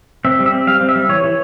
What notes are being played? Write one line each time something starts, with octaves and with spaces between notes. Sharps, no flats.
C4 E5
G3
E5
C4
G3 F5
C4
E5
G3
E3 C#5
E3